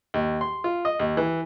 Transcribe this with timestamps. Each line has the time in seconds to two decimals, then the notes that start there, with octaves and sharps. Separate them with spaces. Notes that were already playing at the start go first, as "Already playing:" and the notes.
0.14 D#2
0.41 C6
0.64 F4
0.85 D#5
1.00 D#2
1.17 E3